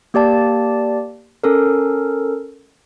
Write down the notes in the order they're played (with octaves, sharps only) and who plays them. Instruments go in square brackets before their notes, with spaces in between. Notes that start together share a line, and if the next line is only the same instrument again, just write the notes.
[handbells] A#3 G4 D5 A5
C#4 A4 A#4